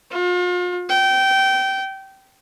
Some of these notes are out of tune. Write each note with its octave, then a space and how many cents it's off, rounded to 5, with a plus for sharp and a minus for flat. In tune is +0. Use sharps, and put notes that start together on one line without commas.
F4 +40
G5 -20